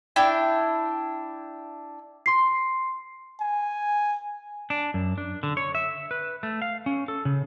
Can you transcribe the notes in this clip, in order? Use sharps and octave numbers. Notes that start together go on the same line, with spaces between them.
D4 E4 G5
C6 C7
G#5
D4
F#2
D4
D3
C#5
E5
B4
A3
F5
C#4
A4
C#3